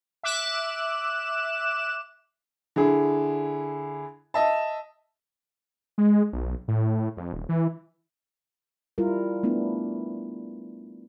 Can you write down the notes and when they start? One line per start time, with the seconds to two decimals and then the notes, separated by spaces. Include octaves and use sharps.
0.23 E5 D6 F#6 E7
2.76 D3 E4 G#4
4.34 D#5 E5 A5
5.98 G#3
6.33 B1
6.68 A2
7.17 F2
7.33 D#1
7.49 E3
8.98 G3 E4 F4 A#4
9.43 A3 B3 D4 E4